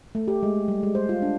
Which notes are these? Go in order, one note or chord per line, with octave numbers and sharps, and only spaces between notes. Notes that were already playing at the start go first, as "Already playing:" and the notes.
A3
G4
G#3
G3
G#3
C5
F4
D4